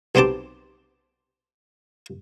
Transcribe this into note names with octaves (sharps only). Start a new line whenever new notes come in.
B1 B3 C4 G4 A5 D6